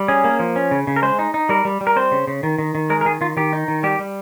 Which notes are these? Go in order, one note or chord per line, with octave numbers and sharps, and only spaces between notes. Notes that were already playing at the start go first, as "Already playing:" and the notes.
Already playing: G3
C#4 G#4
A#3
F3
C#4
C#3
C#3
A#4
G#3 C5
D#4
D#4
G3 A#4
G3
G3
A#4
C4 C5
C#3
C#3
D#3
D#3
D#3
G#3 A#4
A#4
D#3 G#4
D#3 F4
D#3 G4
D#4
D#3
G3 G4
G3